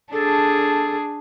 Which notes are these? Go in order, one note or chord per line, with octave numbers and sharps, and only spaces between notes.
D4 G#4 A4